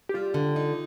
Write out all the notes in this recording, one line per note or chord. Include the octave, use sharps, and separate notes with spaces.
G4
G3 F4
D3
D#4